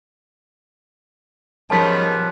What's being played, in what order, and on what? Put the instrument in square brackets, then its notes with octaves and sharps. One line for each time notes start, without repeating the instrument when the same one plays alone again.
[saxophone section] G#2 D#3 C#4 [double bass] F3 [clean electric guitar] G3 B3 B4 [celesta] A5